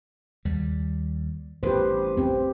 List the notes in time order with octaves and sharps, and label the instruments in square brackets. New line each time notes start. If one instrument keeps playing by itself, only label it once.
[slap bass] D#2 G3
[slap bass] A1 [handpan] G4 B4 C5
[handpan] C4 G4